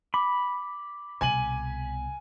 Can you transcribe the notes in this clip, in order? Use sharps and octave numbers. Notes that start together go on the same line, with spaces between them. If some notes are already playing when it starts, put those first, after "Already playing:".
B5 D6
C2 B2 G#5 D#7 F#7